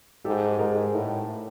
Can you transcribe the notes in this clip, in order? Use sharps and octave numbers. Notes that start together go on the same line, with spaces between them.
G#2 G4 A4
G#2 G#4 A#4
A2